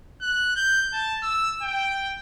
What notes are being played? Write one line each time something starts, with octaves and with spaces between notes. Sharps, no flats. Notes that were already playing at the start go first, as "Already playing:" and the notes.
F#6
G6
A5
E6
G5